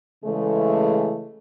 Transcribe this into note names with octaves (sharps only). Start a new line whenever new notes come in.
C#3 E3 G#3 A3